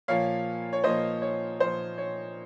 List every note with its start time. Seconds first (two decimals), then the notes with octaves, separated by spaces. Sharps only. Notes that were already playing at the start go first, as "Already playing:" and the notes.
0.08 A#2 F3 A#3 C#5 F5
0.73 C#5
0.84 A#2 F3 A#3 C5 D#5
1.22 C#5
1.59 A#2 F3 A#3 C5
1.98 C#5